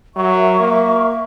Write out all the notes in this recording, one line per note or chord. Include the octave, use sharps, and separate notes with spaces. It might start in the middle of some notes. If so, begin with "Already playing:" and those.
F#3 A#4 E5 C#6
A#3